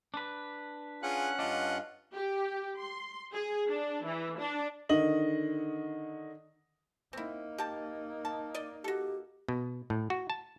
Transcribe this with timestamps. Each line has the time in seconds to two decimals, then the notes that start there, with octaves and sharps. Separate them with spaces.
0.14 D4 B4
1.03 C#4 F4 G#4 F#5 F#6
1.39 G2 D4 F4 D#5
2.14 G4
2.77 C6
3.32 G#4
3.68 D4
4.05 E3
4.39 D4
4.89 D3 D#3 D#5 F#7
7.13 A#3 C4 D#4 E4
7.58 G4 A5
8.25 A5
8.55 D5 D#5
8.84 F#4 G4 A4
9.49 B2
9.90 A2
10.10 F#4
10.30 A5